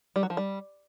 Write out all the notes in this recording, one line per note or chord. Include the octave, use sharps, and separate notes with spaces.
G3
F#3
F3
G3